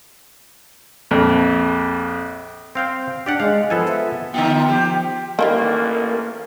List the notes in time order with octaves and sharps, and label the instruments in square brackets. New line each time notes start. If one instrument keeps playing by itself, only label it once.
[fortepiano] A#1 F2
[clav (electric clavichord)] C4 F5 G5
[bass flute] D4 [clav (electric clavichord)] G4 D5 F#5
[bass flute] G#3 [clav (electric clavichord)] F5
[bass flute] F3 [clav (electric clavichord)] B3 A4 G#5
[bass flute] E5
[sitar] D3 D#4 F4 [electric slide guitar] B3 [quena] G5
[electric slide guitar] F3 [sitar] G4
[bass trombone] A1 [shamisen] D#3 F3 G3 [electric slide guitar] A#3